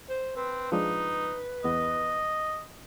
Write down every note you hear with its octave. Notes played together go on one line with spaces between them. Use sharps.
C5
C4 B4
F3 G#3 D4 D#4
E2 B3 D#5